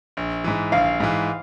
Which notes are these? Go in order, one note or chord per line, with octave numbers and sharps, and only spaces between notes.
A#1
G#2 E3
A#1 F5
G#2 E3